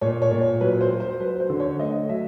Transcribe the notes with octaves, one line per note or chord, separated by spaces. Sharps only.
A#2 C#5
C#5
A#2
C#5
F#3 B4
C5
F#3
C5
F#3 B4
C5
D3
C#5
A3 D#5
F#3 E5